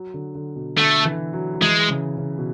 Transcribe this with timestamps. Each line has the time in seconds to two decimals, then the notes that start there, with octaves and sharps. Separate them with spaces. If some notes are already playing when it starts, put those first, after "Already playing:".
Already playing: F#3
0.14 D3
0.35 D3
0.56 B2
0.77 D3 A3
1.05 E3
1.33 F#3
1.54 F#3
1.61 E3 G#3
1.90 C#3
2.17 C#3
2.38 B2